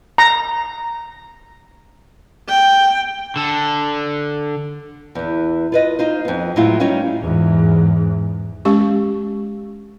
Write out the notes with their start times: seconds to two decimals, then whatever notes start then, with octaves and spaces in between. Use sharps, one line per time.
0.18 A#5
2.49 G5
3.36 D3 A4
5.15 E2 E3
5.72 F4 B4 D#5
5.99 D#4 F4 C5
6.25 F2 B3
6.56 A2 F#3 G#3 E4 F4
6.80 G3 C#4 D#4 F4 C#5
7.22 E2 G#2
8.65 G#3 C#4 G4 C#6